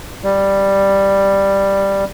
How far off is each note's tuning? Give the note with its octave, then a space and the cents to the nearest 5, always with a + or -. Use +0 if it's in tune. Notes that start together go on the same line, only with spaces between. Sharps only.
G3 +5